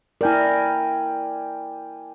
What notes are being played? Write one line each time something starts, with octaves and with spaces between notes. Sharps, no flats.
E4 A#4 D5 G5 G#5